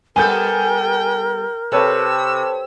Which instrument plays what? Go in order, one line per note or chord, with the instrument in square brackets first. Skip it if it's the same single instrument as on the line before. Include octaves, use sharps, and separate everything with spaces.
[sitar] G3 B3 A4 [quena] A#4 [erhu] G5 [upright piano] G#5 G6
[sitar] C3 [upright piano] A4 B4 C#5 [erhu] E6